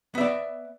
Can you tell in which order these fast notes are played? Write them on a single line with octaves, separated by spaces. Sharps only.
B3 E5 D5